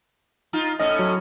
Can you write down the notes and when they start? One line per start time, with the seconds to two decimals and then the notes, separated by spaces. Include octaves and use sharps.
0.53 D#4 F4
0.80 A2 C#4 D#5
0.99 F#3